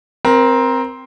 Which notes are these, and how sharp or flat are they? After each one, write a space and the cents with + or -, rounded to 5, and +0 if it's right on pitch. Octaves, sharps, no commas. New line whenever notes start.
C4 +0 A#4 +20